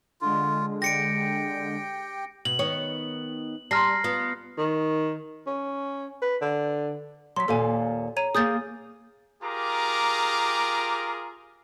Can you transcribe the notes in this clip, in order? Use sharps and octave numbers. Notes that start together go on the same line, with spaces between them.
D3 G#3 F4
G4 G5 A#6 C#7 D7
B2 F#7
D#3 B3 C#5
G3 A5 A#5 C6 F6 A#6 C7
B3 F4
D#3
C#4
B4
D3
F#3 C6 B6
D#2 A#2 A4 F5 G#5
C#5 A#5 D#7
A#3 G#4 D#6 G6 A6
F4 G4 G#4 A#4 A#5 D6